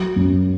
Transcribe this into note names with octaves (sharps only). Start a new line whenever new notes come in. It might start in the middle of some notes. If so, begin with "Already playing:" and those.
Already playing: F#3
F#2